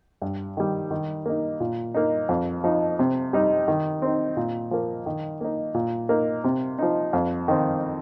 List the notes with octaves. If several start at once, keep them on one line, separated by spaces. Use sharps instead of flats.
G2
D#3 G3
D#3
A#3 D#4
A#2
A#3 D#4
F2
F3 D#4
C3
G3 D#4
D#3
C4 D#4
A#2
F3 A#3
D#3
A#3 D#4
A#2
A#3 D#4
C3
F3 D#4
F2
D#3 C4